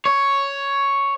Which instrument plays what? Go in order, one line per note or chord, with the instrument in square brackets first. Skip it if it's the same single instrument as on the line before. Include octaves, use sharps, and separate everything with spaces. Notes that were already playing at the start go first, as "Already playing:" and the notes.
[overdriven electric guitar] C#5